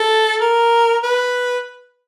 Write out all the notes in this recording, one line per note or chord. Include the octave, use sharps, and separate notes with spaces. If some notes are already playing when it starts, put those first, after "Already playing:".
Already playing: A4
A#4
B4